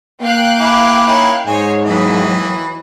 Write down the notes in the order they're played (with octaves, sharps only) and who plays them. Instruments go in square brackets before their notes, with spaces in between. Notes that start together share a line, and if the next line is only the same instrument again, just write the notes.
[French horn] A#3 [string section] F5 G5 F#6
[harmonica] E4 G#5 D6
C#4 D#4 E4
[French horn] G#2 [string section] C5 C#5 [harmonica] D#5 G#5
[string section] D#2 F#3 E5 [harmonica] E3 D#5